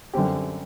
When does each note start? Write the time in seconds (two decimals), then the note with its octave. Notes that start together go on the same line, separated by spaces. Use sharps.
0.14 F#2 D3 G3 C4 G4